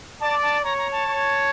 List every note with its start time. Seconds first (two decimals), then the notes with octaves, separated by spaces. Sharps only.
0.20 D5 A5
0.43 A5
0.63 C#5 A#5
0.78 A#5
0.92 A5
1.06 C#5